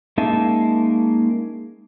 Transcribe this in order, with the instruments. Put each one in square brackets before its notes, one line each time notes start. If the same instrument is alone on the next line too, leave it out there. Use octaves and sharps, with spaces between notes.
[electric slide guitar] G#3 A#3 C#4 D#4 E5 A5